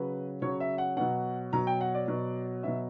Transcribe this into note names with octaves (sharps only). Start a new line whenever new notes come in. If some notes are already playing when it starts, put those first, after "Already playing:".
Already playing: C#3 F#3 B4
C#3 F#3 C#5
E5
F#5
B2 F#3 F#5
B2 F#3 A#5
G5
F#5
D5
B2 F#3
B2 F#3 E5